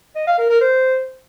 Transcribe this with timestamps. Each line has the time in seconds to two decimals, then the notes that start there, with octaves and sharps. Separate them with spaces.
0.15 D#5
0.27 F5
0.38 A#4
0.50 A#4
0.61 C5